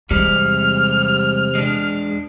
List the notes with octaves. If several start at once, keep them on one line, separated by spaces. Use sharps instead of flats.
E2 C3 G3 G#3 F6
G#3 D4